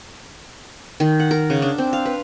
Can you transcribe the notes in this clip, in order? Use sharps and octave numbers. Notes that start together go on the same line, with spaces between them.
D#3
F#5
A#4
C#3
D4
C4
F5
B4